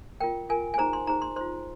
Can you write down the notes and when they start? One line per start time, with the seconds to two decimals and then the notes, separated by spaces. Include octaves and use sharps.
0.20 F4 A#4 G5
0.49 F4 A#4 G#5
0.74 G#5
0.78 D#4 G#4 C5 A#5
0.93 C6
1.07 D#4 G#4 C5 A#5
1.22 C6
1.36 F4 C5 C6